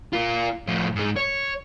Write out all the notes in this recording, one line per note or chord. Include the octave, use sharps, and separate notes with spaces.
A#3 F4
A2 F3
G#2 G#3
C#5